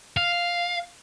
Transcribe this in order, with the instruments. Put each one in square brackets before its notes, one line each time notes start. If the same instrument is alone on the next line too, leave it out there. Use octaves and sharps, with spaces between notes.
[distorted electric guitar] F5